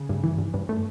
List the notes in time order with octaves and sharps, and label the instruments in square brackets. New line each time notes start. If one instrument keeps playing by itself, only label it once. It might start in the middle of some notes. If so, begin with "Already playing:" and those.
Already playing: [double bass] C#3
[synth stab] G2
E3
G2
G2
A3